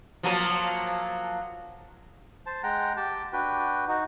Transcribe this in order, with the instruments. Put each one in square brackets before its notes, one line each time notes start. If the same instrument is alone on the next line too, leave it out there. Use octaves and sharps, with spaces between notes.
[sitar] F3 F#3 A#3
[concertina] C5 A5
G#3 F#5 G5 A#5
G4 G5 A5
D4 F#4 B4 G5
D#4 F#4